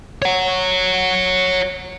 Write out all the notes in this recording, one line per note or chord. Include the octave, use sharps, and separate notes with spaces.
C#5 F#5